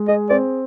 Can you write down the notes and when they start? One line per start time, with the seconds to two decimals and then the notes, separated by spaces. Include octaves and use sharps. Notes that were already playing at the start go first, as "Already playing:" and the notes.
Already playing: G#3
0.08 G#4 D#5
0.30 C4 D5